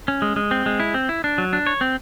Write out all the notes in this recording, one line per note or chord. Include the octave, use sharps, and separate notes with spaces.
C#4
G#3
G#3
C4
G#3
E4
C4
E4
D4
F#3
D4
C#5
C4